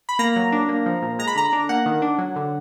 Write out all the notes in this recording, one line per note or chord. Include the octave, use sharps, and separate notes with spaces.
B5
A#3 A#5
F#3
D4
A#3
F3
A#2
G#3 A#5
B5
D3 A#5
D4
A#3 F#5
D#3
D4
F#3
D3